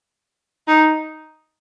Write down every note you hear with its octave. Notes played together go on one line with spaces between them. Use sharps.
D#4